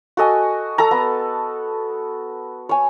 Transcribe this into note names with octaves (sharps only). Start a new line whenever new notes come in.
F#4 A4 D#5 G#5
A4 A5 A#5
B3
C#5 G#5